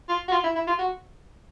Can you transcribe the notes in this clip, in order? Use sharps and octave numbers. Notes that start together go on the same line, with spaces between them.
F4
F#4
F4
E4
E4
F4
F#4